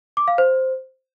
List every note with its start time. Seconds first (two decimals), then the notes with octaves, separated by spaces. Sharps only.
0.17 D6
0.28 F5
0.38 C5